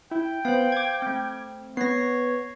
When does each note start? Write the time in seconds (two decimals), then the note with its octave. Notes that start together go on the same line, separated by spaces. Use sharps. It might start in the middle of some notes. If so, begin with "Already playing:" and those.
0.11 E4 G5
0.45 B3 C5 F5
0.72 D6 G#6
1.02 A3 C4
1.77 B3 C#5 A#6 C7